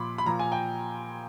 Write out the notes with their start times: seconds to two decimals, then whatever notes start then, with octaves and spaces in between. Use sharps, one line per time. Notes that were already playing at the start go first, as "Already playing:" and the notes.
Already playing: A#2 F3 B5 C6 D6
0.18 B5
0.26 A#2 F3 A#5
0.39 G#5
0.52 G5